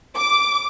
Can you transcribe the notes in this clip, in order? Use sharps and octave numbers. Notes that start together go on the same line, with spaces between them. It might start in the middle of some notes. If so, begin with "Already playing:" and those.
D6